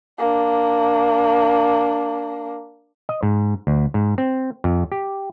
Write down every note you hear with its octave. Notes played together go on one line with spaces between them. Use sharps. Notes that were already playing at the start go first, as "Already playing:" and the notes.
A#3 D4
D#5
G#2
D2
G#2
C4
F2
G4